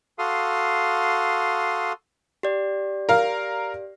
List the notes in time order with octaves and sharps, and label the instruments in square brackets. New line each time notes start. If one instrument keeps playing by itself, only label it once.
[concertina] F#4 A4 F5 C6 D#6
[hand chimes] G4 D5
[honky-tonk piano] A#4 F5